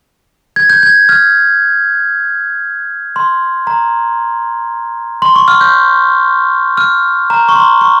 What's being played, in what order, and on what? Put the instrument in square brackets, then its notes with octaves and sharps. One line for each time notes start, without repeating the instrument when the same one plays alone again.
[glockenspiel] G#6
G6
G#6
F6
C6
A#5
C6
C#6
F6
G6
F6
A#5
C#6
C6
C#6